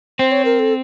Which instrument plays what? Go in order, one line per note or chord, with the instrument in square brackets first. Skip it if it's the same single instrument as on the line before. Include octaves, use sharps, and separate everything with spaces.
[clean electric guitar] C4 [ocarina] C5
[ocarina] C#5
A#4
A4